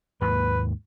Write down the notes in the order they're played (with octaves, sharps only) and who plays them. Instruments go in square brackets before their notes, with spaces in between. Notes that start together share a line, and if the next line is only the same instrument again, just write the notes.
[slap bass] D#2 G#2 A#3 [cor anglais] B4